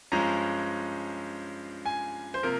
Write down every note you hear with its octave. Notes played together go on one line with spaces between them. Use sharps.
G2 F3 G#3 C#4 A#5
G#5
C5
C3 F3 A#3 A#4